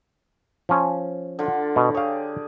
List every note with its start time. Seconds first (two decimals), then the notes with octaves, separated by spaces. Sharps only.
0.69 F3 C#4
1.39 D3 F4
1.76 B2
1.95 G4 G#4 C#5 F5